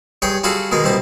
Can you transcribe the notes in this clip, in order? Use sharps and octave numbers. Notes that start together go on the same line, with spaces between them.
G2 G#4 C#5 G5
G3 F4 F#4 G#4 A4
B2 D#3 G#3 D#4
C2 B2 C4 G4